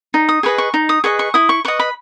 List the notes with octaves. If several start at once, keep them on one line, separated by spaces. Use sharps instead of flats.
D#4
D#6
G#4 B4 D#5 C#6
C#6
D#4
D#6
G#4 B4 D#5 C#6
C#6
E4 D#6
C#6
B4 D#5 C#6
B5